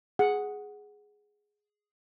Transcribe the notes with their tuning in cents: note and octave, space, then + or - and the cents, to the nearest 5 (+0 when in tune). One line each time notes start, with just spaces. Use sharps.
G#4 +0 F#5 +0